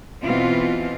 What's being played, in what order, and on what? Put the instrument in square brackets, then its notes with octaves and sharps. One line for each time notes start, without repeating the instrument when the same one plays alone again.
[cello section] B2 E3 C4 F4